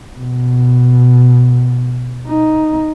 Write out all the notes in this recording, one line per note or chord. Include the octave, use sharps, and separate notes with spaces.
B2
D#4